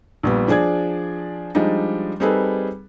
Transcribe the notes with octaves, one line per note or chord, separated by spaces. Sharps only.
A#1 G3 B3
F3 D4 G#4 D5 G#6
F3 G3 G#3 D4 D#4
G3 C4 D#4 G#4 A4 B4